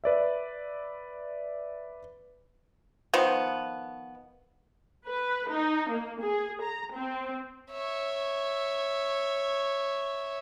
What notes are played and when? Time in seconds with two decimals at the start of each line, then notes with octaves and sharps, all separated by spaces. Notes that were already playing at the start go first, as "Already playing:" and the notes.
0.04 B4 D5 E5
3.13 D#3 F3 B3
5.06 B4
5.50 D#4
5.90 A#3
6.21 G#4
6.62 A#5
6.94 C4
7.72 C#5 E5